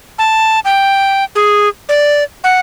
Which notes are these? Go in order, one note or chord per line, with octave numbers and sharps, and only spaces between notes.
A5
G5
G#4
D5
F#5